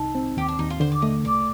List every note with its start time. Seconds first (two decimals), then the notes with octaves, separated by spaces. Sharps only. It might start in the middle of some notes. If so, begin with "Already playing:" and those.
Already playing: C2 D#4 A4
0.15 C4
0.37 D#2 G4
0.48 D4
0.59 D#2 D#4
0.70 F4
0.80 D3 C5
0.92 D5
1.02 A3 D#5
1.24 C2 D5